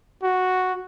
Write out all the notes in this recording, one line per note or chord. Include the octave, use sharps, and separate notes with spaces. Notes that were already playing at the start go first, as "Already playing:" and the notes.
F#4